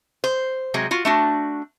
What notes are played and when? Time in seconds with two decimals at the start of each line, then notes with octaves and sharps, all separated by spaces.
0.24 C5
0.74 C3 F#3 G#3
0.91 F4 F#4
1.05 A3 D4 F#4